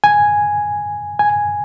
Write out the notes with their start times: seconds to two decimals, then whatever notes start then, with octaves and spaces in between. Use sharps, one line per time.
0.04 G#5
1.19 G#5